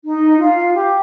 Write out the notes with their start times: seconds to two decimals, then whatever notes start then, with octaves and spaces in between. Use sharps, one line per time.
0.03 D#4
0.38 F4
0.74 G4